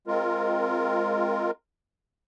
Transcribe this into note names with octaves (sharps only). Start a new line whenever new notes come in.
G#3 C4 F4 A#4